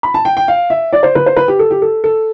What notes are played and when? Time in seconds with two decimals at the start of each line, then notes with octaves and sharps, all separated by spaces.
0.03 B5
0.14 A5
0.25 G5
0.37 G5
0.48 F5
0.70 E5
0.93 D5
1.03 C5
1.15 B4
1.26 C5
1.36 B4
1.48 G4
1.59 A4
1.71 G4
1.82 A4
2.04 A4